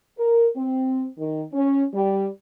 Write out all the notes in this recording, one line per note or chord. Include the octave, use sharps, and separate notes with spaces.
A#4
C4
D#3
C#4
G3